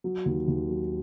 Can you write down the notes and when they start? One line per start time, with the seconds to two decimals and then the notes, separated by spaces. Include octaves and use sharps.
0.04 F#3
0.26 D#2
0.48 D#2
0.69 F#3